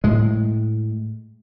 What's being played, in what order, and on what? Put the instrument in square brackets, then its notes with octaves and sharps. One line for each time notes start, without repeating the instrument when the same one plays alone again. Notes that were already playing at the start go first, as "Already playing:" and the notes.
[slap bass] A2 G#3